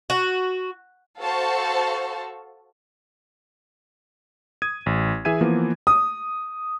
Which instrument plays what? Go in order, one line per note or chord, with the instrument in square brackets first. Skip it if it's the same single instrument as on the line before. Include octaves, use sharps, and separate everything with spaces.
[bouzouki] F#4
[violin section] F#4 A4 C5 F5 A5 C#6
[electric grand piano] D#6 G#6 D#7
A1
E3 G#4 E5 G#5 G#6 D#7
E3 F3 A#3 B3
[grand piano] D#6